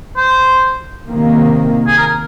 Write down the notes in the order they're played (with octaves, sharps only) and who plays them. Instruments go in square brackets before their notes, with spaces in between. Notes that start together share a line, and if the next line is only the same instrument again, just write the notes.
[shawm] C5
[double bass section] C3 D#3 A#3
[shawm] G#4
A#4